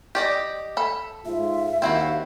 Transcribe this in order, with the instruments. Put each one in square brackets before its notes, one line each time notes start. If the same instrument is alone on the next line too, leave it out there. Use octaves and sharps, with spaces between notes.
[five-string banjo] G4 D5 D#5
A4 B5
[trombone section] G#2 F4 [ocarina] E5
[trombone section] D#2 [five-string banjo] C4 E4 F#4 [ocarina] F5